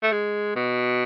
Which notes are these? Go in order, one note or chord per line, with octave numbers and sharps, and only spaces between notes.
A3
G#3
B2